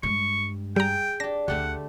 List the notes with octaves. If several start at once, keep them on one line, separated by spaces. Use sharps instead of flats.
G2 G#3 C#6
G3 G#4 G5 A#5
D4 G4 A#6
D2 D3 A3 G4 F#5